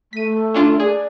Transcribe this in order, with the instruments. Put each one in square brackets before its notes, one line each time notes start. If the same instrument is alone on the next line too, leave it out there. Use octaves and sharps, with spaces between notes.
[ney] A3 [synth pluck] B6 D#7
[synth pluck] C#4 D4 F4
[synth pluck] G#4 [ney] D5